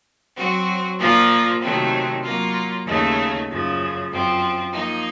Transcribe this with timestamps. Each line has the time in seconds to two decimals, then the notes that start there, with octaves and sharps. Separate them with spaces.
0.37 F#3 C4 F#4
0.99 A#2 F3 A#3 F4
1.61 C3 D#3 F#3 A3 C4
2.23 F#3 A#3 F4
2.85 D#2 C#3 A3 D#4
3.49 F#2 C#3 F3
4.10 F#2 F3 C4
4.72 F3 A#3 D#4